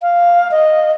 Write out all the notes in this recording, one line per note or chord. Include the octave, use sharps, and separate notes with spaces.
F5
D#5